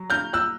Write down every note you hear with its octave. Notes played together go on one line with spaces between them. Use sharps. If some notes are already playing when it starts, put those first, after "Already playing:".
Already playing: F#3
F6 G6
E6 F#6